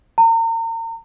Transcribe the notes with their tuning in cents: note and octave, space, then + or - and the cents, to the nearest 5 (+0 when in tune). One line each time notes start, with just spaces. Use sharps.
A#5 -35